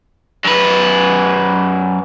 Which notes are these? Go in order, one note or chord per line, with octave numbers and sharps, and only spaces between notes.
F#2 B4